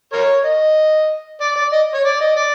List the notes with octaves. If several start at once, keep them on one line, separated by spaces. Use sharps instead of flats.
A#4 C#5
D#5
D5
D5
D#5
C#5
D5
D#5
D5